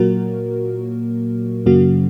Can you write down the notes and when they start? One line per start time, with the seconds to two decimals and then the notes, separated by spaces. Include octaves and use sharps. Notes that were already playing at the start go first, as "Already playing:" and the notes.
Already playing: A#2 F#3 A#3 F#4 A#4
1.66 F#2 C#3 F#3 A#3 F#4